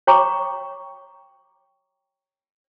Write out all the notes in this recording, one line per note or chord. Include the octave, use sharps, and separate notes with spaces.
C#5 G5 A#5 C#6 D6